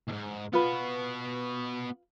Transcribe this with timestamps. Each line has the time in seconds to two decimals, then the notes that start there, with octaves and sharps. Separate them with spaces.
0.08 D#2 G#2
0.53 B3 F4 F#4 B4